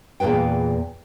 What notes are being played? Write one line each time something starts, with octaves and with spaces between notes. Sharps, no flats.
E2 A#2 G#4 B4 G5